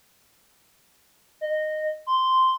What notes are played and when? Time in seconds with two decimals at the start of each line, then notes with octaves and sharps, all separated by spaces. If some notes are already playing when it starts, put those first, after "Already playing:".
1.41 D#5
2.06 C6